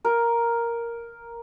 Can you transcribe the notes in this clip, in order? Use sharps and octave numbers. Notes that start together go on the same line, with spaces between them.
A#4